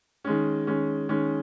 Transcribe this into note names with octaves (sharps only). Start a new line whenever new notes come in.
D#3 G#3 C#4
D#3 G#3 C#4
D#3 G#3 C#4